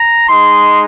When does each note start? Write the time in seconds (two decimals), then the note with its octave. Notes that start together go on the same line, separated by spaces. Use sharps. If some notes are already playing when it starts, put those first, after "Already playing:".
Already playing: A#5
0.28 G#3 D#4 C6